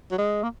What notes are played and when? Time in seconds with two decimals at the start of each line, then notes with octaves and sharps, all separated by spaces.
0.11 F#3
0.18 G#3
0.43 A#3